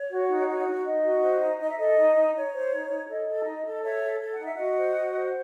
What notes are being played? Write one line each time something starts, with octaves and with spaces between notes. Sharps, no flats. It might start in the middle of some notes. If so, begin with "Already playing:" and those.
Already playing: C#5
F#4
D#4
F#4
D#4
D#4 D#5
F#4
C5
D#4
D#4 D#5
E5
A4 D#5
D#4
D#4
D#4 C#5
C5
D#4
D#4
A4 D#5
A4
D#4
A4
A4 C#5 E5
A4
A4
F#5
D#4
E5
F#4 D#5 F#5
C5
F#4
C5